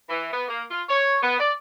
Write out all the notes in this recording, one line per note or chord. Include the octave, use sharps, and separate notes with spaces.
E3
B3
A#3
F4
C#5
B3
D5